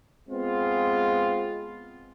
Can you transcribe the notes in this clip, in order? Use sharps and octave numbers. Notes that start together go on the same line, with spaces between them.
G#3 B3 C4 F4